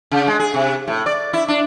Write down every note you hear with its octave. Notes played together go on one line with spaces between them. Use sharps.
C#3
G#3
G#4
C3
A2
D5
E4
D4